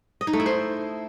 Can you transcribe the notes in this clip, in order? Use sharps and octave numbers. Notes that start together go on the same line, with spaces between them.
D#5
D#4
A3
E4
C5